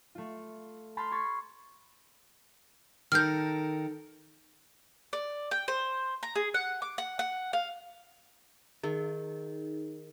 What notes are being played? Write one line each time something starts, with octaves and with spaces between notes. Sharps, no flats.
A3 F4
A5 B5 C6 F6 G6
B5 C#6 G#6 A6 C7
D#3 A4 A#4 F6 G6
D5
G5
C5
A#5
G#4
F#5
D6
F#5
F#5
F5
D#3 D#4 G#4